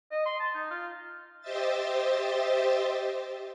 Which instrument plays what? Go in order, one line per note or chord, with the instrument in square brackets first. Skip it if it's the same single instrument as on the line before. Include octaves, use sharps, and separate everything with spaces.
[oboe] D#5
C6
A5
D#4
F4
[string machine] G4 C5 D#5 E5 A6